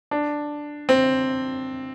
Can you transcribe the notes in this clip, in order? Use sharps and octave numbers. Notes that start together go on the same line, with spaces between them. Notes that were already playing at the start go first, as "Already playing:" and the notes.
D4
C4